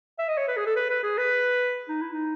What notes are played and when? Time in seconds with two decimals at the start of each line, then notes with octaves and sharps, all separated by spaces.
0.19 E5
0.28 D#5
0.38 C#5
0.48 B4
0.57 G#4
0.66 A4
0.76 B4
0.90 B4
1.04 G#4
1.18 B4
1.89 D#4
2.01 E4
2.13 D#4